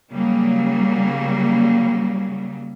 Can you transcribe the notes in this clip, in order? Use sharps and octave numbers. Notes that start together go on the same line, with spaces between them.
C#3 F#3 G3 A#3